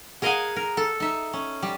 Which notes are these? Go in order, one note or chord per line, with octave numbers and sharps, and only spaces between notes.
G#4 A#4 D#5 F5 F#5 G#5
A#4
A4
D#4 E5
C#4
G3